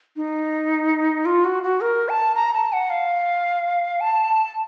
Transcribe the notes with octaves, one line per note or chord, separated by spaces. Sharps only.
D#4
F4
F#4
F#4
A#4
A5
A#5
A5
F#5
F5
A5